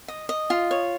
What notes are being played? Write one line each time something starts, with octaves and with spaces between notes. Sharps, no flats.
D#5
D#5
F4
C#5